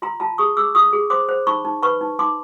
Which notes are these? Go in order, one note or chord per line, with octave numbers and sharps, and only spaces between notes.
F4 A#5 C6
F4 A5 B5
G#4 C#6 D#6
G#4 D6 E6
F4 C#6 D#6
G#4
C5 C6 D6
C5
D#4 B5 C#6
D#4
B4 B5 C#6
D#4
D#4 C6 D6